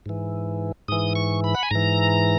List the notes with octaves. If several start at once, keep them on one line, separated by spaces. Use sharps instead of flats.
G#2 E3
G#2 E3 D#6
C#6
B5
F#5
G#5
G#2 E3 A#5